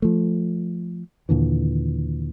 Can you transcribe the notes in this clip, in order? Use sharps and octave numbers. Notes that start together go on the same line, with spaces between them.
F3 A3
D#2 A#2 D3 E3